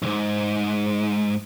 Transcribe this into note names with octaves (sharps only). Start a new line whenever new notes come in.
B1 G#2